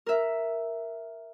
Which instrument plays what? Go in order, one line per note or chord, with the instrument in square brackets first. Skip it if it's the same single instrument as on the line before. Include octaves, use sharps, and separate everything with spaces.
[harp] A#4 E5